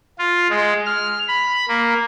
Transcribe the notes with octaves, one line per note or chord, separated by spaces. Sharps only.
F4
G#3
F6
B5
A#3